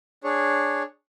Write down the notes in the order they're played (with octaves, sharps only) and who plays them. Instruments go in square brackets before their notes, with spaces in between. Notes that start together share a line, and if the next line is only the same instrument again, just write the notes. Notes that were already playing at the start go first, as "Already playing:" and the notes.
[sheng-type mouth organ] D4 G#4 C#5